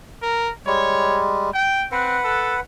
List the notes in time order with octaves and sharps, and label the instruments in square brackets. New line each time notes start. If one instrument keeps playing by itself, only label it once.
[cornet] A#4
[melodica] G3 G#3 [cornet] C#5
[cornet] G5
[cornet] C4 [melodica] B4 F#5
[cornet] A4